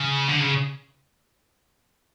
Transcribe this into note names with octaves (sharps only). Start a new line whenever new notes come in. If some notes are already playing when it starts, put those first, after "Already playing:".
Already playing: C#3
D3
C#3